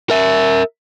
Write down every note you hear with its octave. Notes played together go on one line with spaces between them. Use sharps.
A#4 E5